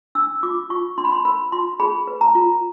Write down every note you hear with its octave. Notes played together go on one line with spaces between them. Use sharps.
D4 E6
F4 D6
F4 C#6
D4 C6
B5
C6
A#4 B5
F4 C6
G#4 B5
B4
A#5
F4